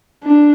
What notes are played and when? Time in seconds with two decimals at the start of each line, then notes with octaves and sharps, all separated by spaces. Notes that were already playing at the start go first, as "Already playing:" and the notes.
0.24 D4